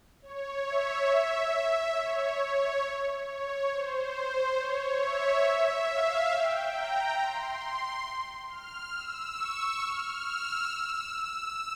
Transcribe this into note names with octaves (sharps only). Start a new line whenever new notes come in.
C#5
E5
C#5
C#5
C#5
C5
C5
C#5
E5
E5
F5
G5
A#5
C6
F6
E6
C#6
F6
E6
E6
E6